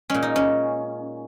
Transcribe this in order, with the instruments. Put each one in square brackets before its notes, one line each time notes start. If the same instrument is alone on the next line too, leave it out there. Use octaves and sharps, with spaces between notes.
[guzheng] A#2 G#3 C#4
D#4
C#4